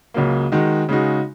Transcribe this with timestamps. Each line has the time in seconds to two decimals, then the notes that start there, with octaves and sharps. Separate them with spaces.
0.14 C#2 C#3 F#3 A#3
0.52 D#3 G#3 D#4 F#4
0.89 C#3 G#3 D#4 F#4